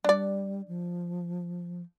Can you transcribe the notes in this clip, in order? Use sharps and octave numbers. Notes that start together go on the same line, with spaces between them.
G3 D4 D5
F3